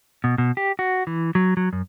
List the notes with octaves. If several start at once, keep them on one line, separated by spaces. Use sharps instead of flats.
B2
B2
G4
F#4
E3
F#3
F#3
F#2